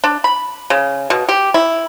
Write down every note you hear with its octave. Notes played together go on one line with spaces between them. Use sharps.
D4
B5
C#3
B2
G4
E4